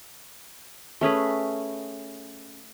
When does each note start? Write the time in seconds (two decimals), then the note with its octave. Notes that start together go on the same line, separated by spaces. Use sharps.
1.01 A3 C#4 G#4 B4